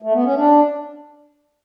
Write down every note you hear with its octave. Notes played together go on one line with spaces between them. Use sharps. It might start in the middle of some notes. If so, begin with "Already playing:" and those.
A3
B3
C#4
D4